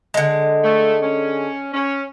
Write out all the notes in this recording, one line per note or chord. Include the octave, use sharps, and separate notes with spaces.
D3 G#3
A3
C#4
C#4